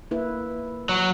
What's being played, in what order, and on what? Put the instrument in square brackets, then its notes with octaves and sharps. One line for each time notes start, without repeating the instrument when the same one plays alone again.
[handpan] A#3 E4 B4
[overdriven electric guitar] F#3